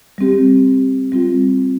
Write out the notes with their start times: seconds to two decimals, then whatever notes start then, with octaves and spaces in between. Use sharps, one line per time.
0.18 G3 C4 G4
1.12 G3 C4 F4